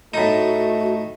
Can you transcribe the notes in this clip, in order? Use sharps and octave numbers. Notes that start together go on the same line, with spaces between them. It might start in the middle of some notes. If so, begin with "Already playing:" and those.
A2 A3 D#4 F#4